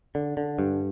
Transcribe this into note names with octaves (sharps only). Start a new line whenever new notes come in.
D3
D3
G2